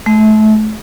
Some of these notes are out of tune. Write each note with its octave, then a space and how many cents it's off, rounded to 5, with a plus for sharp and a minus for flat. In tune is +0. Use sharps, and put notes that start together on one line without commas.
A3 -30